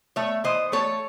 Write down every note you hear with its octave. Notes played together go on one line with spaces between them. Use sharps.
A3 C#5 E5
E3 C5 D#5
A3 A4 C#5